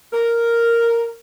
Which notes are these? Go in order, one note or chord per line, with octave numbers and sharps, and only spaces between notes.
A#4